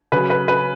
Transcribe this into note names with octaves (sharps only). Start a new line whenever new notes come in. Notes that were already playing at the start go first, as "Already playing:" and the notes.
C#3 F#3 B4
B4
B4